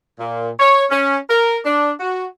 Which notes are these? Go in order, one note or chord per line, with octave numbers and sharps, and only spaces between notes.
A#2
C#5
C#4
A#4
D4
F#4